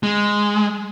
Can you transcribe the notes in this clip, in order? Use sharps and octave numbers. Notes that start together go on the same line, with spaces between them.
G#3